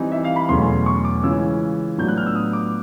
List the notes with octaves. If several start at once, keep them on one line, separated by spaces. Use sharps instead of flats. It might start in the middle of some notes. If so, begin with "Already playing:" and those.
Already playing: E3 G3 C4 D#4
E5
F5
B5
E2 B2 F#3 A3 C#4 C6
C#6
D6
C#3 E3 G#3 C#4 F4 E6
A2 F#3 B3 D4 F4 G6
F#6
F6
E6
D#6
D6